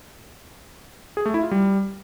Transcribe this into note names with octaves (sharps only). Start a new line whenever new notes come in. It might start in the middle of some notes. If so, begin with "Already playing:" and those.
G#4
A3
E4
F4
G3